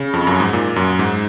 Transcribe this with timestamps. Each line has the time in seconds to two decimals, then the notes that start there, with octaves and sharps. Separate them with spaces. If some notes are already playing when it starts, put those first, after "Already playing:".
Already playing: C#3
0.13 F2
0.27 F#2
0.40 G#2
0.53 A#2
0.76 F#2
0.99 G#2